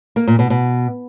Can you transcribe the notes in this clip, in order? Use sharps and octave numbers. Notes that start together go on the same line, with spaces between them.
A#3
A#2
B2
B2